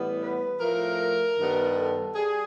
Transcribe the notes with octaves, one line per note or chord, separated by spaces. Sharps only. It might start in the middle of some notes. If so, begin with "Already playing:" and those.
Already playing: A2 E3 G3 B3
B4
A2 F3 A3 A#4
G2 D#3 G3 B3
A4
G3 G#4